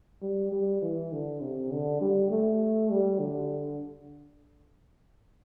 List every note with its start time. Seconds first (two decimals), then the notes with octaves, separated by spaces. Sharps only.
0.22 G3
0.52 G3
0.82 E3
1.12 D3
1.41 C3
1.71 D3
2.01 G3
2.30 A3
2.90 G3
3.20 D3